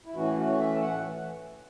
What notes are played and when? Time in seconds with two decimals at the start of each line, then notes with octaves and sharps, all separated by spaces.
0.06 E4
0.15 A2 E3 A3 C#4 F#4
0.37 F#4
0.48 C#5
0.59 E5
0.76 A5
0.80 F#5